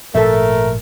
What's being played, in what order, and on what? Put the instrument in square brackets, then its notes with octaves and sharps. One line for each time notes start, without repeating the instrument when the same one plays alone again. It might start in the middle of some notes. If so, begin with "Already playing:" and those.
[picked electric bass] G#1 A#2 F3 [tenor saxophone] A3 [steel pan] A4 E5 [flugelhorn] A#4